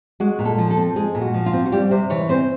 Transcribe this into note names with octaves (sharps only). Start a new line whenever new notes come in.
G#3 F#4
A#2
A4
F3
A4
C4
G#3 G#4
A#2
F#4
F3
F4
C4
F#4
G3 G4
C3 C5
E3 C#5
C4 C5